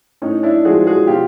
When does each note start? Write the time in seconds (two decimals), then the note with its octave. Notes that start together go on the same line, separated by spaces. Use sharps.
0.22 A2 C#4 D#4
0.43 D4 E4
0.65 F3 G#3 F#4 G#4
0.87 F#4 G#4
1.07 B2 F4 G4